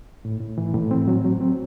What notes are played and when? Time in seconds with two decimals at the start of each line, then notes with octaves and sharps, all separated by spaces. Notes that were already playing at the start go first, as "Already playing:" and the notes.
0.25 A2
0.41 A2
0.58 E3
0.74 A2
0.91 C4
1.08 F#3
1.24 F#3
1.41 C4